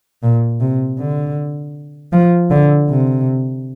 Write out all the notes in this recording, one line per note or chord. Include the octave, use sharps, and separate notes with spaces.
A#2
C3
D3
F3
D3
C3